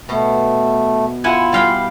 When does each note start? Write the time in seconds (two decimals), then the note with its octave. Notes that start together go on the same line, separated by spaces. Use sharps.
0.09 B2 A3
1.24 E4 F4 F#5 G#5
1.53 G3 F5 G5